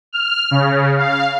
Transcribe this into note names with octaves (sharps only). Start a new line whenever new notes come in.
F6
C#3
F5